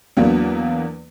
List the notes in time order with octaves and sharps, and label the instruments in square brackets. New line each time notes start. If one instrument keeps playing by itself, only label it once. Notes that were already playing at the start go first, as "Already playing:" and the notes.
[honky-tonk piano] E2 F#3 A#3 B3 D4